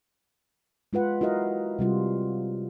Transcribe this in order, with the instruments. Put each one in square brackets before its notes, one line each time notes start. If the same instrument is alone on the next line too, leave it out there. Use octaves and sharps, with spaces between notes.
[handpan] G#3 F4 B4 F#5
E4 F#4 A#4 D#5 F5
C3 G3 F4